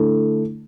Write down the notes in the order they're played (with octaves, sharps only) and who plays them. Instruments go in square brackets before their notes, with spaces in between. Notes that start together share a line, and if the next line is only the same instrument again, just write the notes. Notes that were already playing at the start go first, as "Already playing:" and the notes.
Already playing: [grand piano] D3 A3 E4 A4